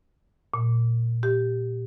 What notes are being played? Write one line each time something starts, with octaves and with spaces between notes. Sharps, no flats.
A#2
G4